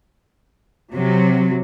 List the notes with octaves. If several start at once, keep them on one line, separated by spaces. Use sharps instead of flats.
C3 F#3